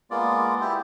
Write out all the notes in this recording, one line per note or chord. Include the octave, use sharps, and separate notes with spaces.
G#3 A#3 B3 F4 D5
E4 G4